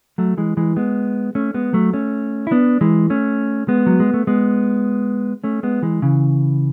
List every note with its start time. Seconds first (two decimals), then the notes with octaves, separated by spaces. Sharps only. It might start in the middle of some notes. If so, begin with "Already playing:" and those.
0.18 F#3 A3
0.38 E3 G#3
0.57 E3 G#3
0.76 G#3 B3
1.35 A3 C#4
1.54 G#3 B3
1.73 F#3 A3
1.93 A3 C#4
2.47 E4
2.51 B3 D4
2.81 E3 G#3
3.10 A3 C#4
3.68 G#3 B3
3.86 F#3
4.00 G#3
4.14 A3
4.27 G#3 B3
5.44 A3 C#4
5.63 G#3 B3
5.82 E3 G#3
6.02 C#3 E3